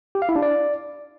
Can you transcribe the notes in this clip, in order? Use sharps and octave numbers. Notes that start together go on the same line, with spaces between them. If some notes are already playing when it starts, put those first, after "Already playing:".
G4
F5
E4
D4
D5